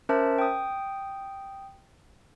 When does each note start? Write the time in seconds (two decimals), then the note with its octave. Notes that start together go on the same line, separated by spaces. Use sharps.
0.09 C#4 A#4 C5 E5 A5
0.38 G5 D#6